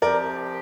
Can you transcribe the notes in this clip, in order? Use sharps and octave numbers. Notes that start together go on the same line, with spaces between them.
C2 C3 F3 C4 G4 A#4 D5